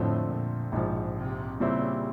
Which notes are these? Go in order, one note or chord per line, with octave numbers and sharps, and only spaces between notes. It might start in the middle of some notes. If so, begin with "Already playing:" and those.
Already playing: F2 A2 D3 F3 A3 C4
A#2
A#1 G#2 B2 F3
C3
A#2 C#3 G3 C4 E4 G4